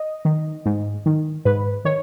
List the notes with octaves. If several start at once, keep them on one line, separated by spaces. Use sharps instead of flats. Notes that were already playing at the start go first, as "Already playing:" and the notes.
Already playing: D#5
D#3
G#2
D#3
G#2 B4
D#3 C#5